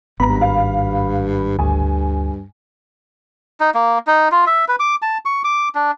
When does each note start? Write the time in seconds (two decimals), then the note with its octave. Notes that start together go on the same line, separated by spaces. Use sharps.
0.20 G#1 G2 B3 A#5 B5
0.41 F5
1.59 D2 G2 G#5
3.60 D#4
3.75 A#3
4.07 D#4
4.32 F4
4.47 E5
4.68 B4
4.80 D6
5.02 A5
5.25 C#6
5.44 D6
5.75 D4